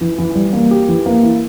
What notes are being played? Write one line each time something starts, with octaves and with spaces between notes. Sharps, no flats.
E3
E3
G3
A#3
G4
E3
A#3
E4